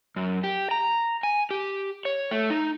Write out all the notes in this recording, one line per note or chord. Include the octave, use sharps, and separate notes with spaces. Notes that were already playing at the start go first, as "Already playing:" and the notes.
F#2
G4
A#5
G#5
G4
C#5
A3
D#4